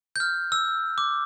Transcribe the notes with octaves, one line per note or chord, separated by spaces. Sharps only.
G6
F6
E6
D6